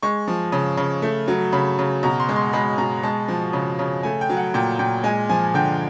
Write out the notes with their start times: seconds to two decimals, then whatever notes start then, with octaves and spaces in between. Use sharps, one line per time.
0.03 G#3 C#6
0.28 F3
0.52 C#3
0.77 C#3
1.02 A3
1.28 F#3
1.52 C#3 B5
1.79 C#3
2.03 B2 A#5
2.20 C6
2.29 G#3
2.36 C6
2.53 G#3 B5
2.78 B2 A#5
3.03 G#3 A5
3.28 F3
3.53 C#3
3.79 C#3
4.03 A3 G#5
4.21 G5
4.30 F#3
4.37 F#5
4.54 A#2 G5
4.79 A#2 G5
5.04 G#3 G#5
5.29 F3 G#5
5.54 D3 G5